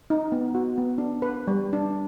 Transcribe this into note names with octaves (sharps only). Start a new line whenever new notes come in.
D#4
B3
F#4
B3
D4
B4
G3
D4